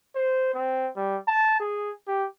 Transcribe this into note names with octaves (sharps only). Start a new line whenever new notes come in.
C5
C4
G3
A5
G#4
G4